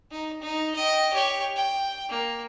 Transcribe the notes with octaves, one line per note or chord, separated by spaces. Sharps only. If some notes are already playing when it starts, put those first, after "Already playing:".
D#4
D#4
D#5 G5
G4 C#5
G5
A#3